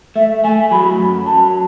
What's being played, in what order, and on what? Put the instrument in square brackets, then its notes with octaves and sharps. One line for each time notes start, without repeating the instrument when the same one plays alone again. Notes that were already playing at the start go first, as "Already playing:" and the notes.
[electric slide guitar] A3 [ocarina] E5
[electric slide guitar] A3 [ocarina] G#5
[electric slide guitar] F#3 [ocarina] B5
[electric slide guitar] F#2
[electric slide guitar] F#3 [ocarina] A5